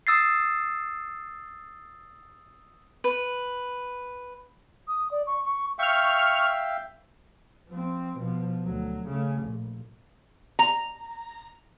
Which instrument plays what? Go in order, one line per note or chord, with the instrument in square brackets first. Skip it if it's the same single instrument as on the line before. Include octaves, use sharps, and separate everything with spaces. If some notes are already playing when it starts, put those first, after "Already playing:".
[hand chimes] D#6 E6 A6 C7
[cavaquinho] B4
[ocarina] D#6
D5
C#6
C#6
[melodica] E5 F5 G5 [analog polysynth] C#6 F6
[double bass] F3 C4
B2 F3
D2 F#3
C#3 A3
A#1
[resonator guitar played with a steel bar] A#5